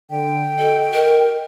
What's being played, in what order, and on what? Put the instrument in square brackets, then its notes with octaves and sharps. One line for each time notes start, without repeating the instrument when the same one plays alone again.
[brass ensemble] D3 [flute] G5
[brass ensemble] F#4 D#5 [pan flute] A4
[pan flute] A#4